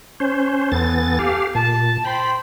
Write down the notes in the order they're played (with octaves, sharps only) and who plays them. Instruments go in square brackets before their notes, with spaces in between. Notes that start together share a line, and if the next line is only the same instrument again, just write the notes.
[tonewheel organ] C#4 C5
[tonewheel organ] E2 B3 A6 [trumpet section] A4 G#5
[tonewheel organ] G4 F5
[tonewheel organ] A#2 [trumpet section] A5
[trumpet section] C5 G5 [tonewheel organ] B5